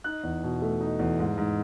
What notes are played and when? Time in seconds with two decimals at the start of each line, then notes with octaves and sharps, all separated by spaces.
0.04 D#4 F#6
0.23 E2
0.44 B2
0.62 A3
0.80 D#4
0.99 E2
1.19 G#2
1.38 G#2